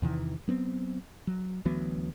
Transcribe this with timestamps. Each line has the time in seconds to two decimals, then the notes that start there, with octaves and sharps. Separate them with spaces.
0.02 E2 C3 D#3 E3
0.48 F#3 B3 C4
1.27 F#3
1.65 D2 E3 F#3 B3